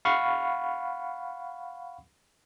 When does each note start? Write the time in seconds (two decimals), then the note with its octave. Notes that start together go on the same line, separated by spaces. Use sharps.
0.05 F5 F#5 B5 C#6